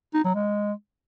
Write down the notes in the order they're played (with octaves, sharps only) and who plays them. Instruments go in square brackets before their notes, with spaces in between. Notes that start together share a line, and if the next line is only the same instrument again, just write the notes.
[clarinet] D#4
F#3
G#3